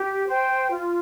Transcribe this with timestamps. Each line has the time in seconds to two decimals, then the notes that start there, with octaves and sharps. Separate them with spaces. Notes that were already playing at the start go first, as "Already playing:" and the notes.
Already playing: G4
0.27 C5 G5
0.70 F4